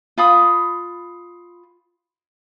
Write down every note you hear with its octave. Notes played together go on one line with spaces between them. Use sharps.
F4 B5 D#6